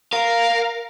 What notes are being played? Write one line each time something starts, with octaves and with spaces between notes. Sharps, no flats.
A#4 F5